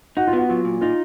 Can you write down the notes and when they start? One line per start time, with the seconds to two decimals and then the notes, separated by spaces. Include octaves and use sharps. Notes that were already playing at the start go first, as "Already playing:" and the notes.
0.17 D#4 F#4
0.28 F4
0.33 B3 F#4
0.49 F#3 F4
0.65 A#2
0.81 D#4 F4